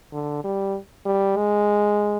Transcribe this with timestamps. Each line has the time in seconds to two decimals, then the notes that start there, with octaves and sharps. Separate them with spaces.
0.13 D3
0.44 G3
1.05 G3
1.36 G#3